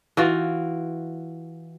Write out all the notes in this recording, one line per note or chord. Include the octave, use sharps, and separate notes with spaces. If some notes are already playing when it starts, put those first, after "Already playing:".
E3 F4 F#4